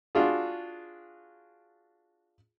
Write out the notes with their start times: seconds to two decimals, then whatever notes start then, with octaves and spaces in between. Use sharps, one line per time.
0.15 D4 F4 F#4 G#4